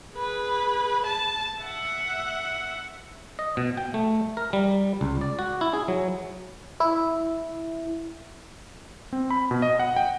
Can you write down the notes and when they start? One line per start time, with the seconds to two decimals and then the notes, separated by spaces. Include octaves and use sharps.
0.14 G#4 B4
1.06 A5
1.62 E5 F#5
3.39 D#5
3.57 B2
3.77 G5
3.94 A3
4.37 A#4
4.53 G3
5.01 C#2
5.21 D5
5.39 F#4
5.61 E4
5.73 G#4
5.88 F#3
6.80 E4
9.13 C4
9.31 B5
9.51 B2
9.62 D#5
9.79 F#5
9.97 G5